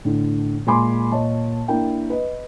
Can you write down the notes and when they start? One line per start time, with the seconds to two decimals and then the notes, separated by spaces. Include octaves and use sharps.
0.05 A2 D3
0.67 A#2 G#3 G#5 B5 C6 D6
1.11 A#2 C#5 D#5 A5
1.68 A#3 D4 E4 G5
2.10 B4 D#5